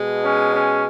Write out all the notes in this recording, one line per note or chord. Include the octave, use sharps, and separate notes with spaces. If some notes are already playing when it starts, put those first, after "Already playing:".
Already playing: B2 G#3
C#4
C#4